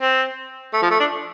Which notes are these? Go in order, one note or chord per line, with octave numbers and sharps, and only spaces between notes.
C4
A3
F3
A3
D4